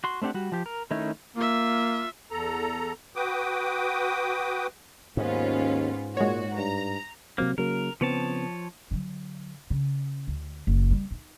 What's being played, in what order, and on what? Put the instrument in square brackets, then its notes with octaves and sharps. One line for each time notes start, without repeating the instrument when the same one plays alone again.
[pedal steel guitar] F#4 C6
A3 C4 D4 G4 F#5
G3 F#4
F3 G4
A#4
D#3 A3 C#4 D#4 E4
[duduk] A#3 [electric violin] F4 E5
[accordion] E2 A4 A#5
F#4 B4 G5 D6 D#6
[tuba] D#2 [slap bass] G#2 [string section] B3 C#4 F4
[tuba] A#2 [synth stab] G#3 C#5 [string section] F#4
[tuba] G2 [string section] A#5
[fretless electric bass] C3 F#3 C4 [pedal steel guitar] A#3
[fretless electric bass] C#3 F#3 A#3 [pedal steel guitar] A#4
[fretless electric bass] C#3 B3 C4 [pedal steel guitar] F3 C#5 A5
[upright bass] D3 F#3
C#3
D2
F#1
G3
D#4